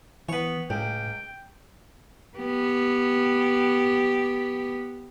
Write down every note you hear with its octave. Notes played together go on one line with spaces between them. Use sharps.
E3 B3 B4 C#5
C#2 A2 G5
B3 G4